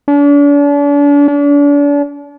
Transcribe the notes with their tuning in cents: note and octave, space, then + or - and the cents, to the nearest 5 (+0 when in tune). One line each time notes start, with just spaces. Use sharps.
D4 -40
D4 -40